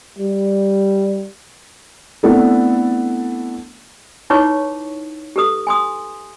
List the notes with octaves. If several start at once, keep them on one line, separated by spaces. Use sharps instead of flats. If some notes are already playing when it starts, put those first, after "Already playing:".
G3
A3 B3 C4 D4 E4 A4
D#4 E4 B4 C#5 C#6 D6
G4 A4 B4 D#6
G#5 C6 D#6